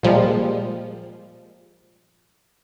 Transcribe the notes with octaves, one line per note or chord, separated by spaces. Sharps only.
A#2 F3 G3 G#3